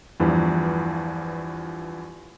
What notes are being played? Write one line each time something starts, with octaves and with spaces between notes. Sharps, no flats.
E2 G2 E3 F3